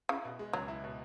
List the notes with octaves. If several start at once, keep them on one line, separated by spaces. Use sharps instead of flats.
C#3 E4
B2
G#3
C#2 F#3
E4
B2